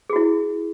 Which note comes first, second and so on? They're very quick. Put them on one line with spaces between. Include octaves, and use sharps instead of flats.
G#4 F#4 E4